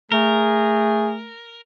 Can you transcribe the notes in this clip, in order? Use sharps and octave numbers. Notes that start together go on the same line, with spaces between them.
A3 G#4 A#4